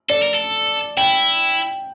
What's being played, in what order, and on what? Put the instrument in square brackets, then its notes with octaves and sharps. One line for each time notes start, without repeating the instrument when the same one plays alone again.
[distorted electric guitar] A4 [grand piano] D5
[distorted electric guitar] A#4
A4
[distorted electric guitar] E4 [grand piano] G5